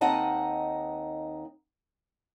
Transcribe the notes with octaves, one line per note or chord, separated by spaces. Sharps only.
D#2 C4 D#4 D#5 F#5 A5